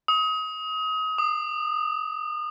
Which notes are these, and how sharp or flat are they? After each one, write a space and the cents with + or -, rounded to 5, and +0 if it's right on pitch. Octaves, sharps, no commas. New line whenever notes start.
D#6 +30
D#6 -35